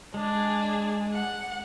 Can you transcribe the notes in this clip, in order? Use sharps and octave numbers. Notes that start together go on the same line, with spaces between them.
G#3 D4 G#4
F#5